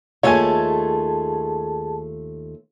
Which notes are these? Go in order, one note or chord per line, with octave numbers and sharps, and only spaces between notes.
D#2 A3 F4 G#4 C#5 G#5 A5